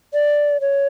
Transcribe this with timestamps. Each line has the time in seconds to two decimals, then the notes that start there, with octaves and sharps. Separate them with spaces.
0.14 D5
0.61 C#5